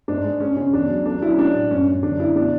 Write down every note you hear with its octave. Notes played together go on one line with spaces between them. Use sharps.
G#2 D4
G#3
G#3 C#4
C#3 C#4
E2 D4
F#3
A3 D4
F#3 E4
C#4
G#3 D4
A2
F#2 C#4
F#2
D3 D4
D3 E4
B2 D4